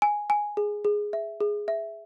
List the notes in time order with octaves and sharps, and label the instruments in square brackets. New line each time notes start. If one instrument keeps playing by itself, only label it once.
[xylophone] G#5
G#5
G#4
G#4
E5
G#4
E5